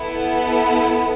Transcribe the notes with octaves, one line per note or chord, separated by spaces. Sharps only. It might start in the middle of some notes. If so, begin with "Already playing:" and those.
Already playing: B3 E4 A4
B5